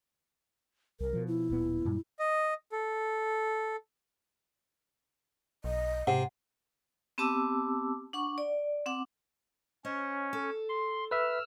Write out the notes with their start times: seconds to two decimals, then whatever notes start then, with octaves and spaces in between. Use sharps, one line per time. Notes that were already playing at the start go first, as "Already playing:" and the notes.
1.00 C2 A#4
1.13 B2 F3
1.28 E4
1.50 D1 A#2 B3
1.85 F#2 A#2 G3
2.19 D#5
2.72 A4
5.64 B1 D#5
6.07 G#2 C3 F#5
7.18 B3 C4 G4 A5 D6 E6
8.13 D4 F#5 C#6
8.38 D5
8.86 C4 F#5 D6
9.85 C#4 C5 C#5 D#5
10.33 A4
10.69 C6
11.11 B4 E5 E6 F6